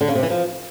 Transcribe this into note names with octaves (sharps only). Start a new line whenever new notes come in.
D3
C#3
C3
E3
F3